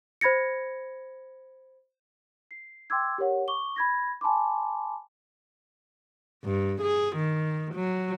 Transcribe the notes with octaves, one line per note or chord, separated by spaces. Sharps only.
C5 B5 G#6 A#6 C#7
C7
G5 C6 D6 E6 G#6
G4 A#4 C#5 F#5
C#6 D6 G7
B5 G#6 A#6
G#5 A5 B5 C6 D6
G2
G#4
D#3
F#3